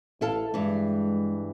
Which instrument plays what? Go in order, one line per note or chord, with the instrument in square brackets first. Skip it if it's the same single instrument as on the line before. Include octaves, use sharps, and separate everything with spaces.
[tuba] A1 [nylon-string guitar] E4 A4 F5
[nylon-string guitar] G2 E3 [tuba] G#3